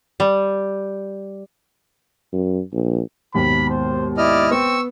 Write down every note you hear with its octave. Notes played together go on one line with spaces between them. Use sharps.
G3
F#2
A#1
D#2 G#2 B2 B5
C5
E4 D5 D#5 F6
B3 C4 C#6 E6